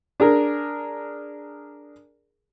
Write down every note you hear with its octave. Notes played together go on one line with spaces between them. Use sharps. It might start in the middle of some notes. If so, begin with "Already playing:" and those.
D4 G#4 A#4